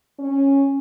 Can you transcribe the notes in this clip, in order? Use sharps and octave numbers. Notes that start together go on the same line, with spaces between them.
C#4